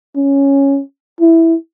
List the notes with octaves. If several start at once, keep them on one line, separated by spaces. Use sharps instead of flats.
C#4
E4